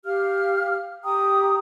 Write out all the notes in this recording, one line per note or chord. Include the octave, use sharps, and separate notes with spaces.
G4 F5 F6
G4 G5 A#5 D#6